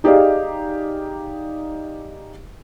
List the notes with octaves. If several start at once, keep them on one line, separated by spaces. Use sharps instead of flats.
D#4 G4 G#4 D5 D#5 F5